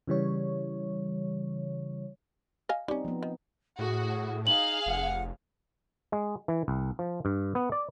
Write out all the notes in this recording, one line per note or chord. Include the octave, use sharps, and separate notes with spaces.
C#3 E3 G3 C#5
D#5 F5 G#5
G3 C4 C#4 D#4
F3 B3
D#3
A2 F#4 G#4
D#4 G#4 F5 F#7
F1 F#5
G#3
E3
C2
F3
G2
B3
D5